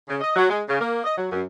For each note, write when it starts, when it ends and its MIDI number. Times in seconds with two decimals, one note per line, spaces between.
0.09 0.16 49
0.21 0.32 75
0.35 0.48 54
0.49 0.62 56
0.68 0.80 49
0.81 1.01 58
1.04 1.14 75
1.16 1.31 54
1.32 1.43 42